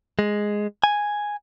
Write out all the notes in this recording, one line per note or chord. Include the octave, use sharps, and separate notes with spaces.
G#3
G#5